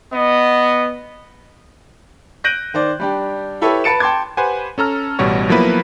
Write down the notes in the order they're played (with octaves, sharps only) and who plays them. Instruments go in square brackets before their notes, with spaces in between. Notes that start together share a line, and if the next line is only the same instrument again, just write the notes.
[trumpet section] B3 D#5
[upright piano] F#6 G6 A#6 D7 D#7 F#7
D#3 C5 D5
G3 D4 G4
E4 G4 A4 B4 C#5 E5
B4 A5 A6 C#7 D7 E7
G5 A5 C6 D6 G#6
[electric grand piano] G4 B4 C5 F#5 G#5
C#4 A4 A#5 F6
A1 B2 G3 F#4 C#5
F3 F#3 A#3 B3 E4 B4